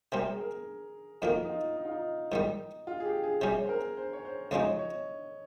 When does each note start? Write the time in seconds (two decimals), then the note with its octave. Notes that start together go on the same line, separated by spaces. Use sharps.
0.12 C3 G3 C4 A#4
0.30 G#4
0.40 A#4
1.22 F2 D#3 A#3 A#4
1.44 D#4
1.49 F4
1.77 D#4
1.85 F4
1.91 D#4
2.32 G#2 D#3 G3
2.87 F4
3.00 G#4
3.05 G4
3.23 G#4
3.41 C3 G3 C#4 G#4
3.65 C5
3.69 A#4
3.97 C5
4.13 C#5
4.25 C5
4.51 C#2 C#3 F3 G#3 D#4 C#5
4.66 D#5
4.79 C#5